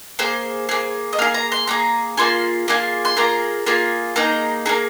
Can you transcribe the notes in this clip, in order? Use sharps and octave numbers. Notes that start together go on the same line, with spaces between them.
A#3 G#4 C5
A#3 G#4
D#5
A#3 G#4 F5
A#5
C6
A#3 G#4 A#5
A#3 F4 G#4 C6
A#3 F4 G#4
C6
A#3 F4 G#4 A#5
A#3 F4 G#4
A#3 D#4 G#4 A#5
A#3 D#4 G#4 A#5